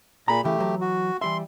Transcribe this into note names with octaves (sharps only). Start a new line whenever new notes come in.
A#2 G#4 A#5 B5
C#3 E3 A3 G4
E3 F#3
F#4
E3 G3 E5 C6